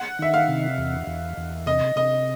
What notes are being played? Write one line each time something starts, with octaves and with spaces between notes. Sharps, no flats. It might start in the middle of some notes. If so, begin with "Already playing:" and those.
Already playing: F#5
D#3 E5
F5
C3
E2
E2
E2
C3 D#5
C3 D#5